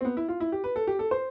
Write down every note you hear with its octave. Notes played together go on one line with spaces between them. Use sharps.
C4
B3
E4
F4
E4
G4
B4
A4
G4
A4
C5